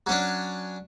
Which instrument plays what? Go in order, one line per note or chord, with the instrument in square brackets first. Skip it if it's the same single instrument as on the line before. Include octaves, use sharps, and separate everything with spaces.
[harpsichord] F#3 C#4 D4